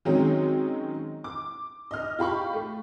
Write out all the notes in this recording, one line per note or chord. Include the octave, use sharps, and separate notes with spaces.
D#3 F#3 G#3 C4 C#4 D#4
D6
D#5 F6
F4 G4 B5 C#6
A3